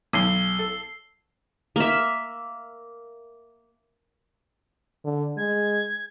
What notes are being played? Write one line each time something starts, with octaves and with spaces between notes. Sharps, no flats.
B1 E6 C7 G7
A4
A#3 E5
D3
G#3 G#6